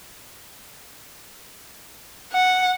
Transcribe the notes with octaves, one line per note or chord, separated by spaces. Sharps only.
F#5